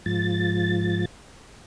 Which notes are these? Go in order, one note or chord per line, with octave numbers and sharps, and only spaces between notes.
G#2 F3 A6